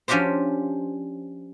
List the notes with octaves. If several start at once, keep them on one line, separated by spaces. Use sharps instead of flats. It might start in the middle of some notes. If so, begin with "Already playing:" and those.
F3 C#4 D4 F#4 G4 C5